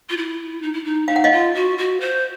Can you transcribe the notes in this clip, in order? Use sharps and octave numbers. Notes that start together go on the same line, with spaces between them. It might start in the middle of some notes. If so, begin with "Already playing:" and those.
F4
E4
D#4
E4
D#4
D#4 F5
F#5
D#5 F5
F4
F#4
F#4
C5